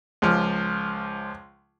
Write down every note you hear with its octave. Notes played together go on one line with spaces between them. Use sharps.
C#2 F3